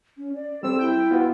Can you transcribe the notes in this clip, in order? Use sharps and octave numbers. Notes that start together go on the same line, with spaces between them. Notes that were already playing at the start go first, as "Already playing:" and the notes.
C#4
D5
G3 C4 A4 E6
E4 G5
B3 F4 F#4 B4